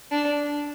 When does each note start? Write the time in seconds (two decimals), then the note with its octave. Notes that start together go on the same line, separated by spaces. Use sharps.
0.11 D4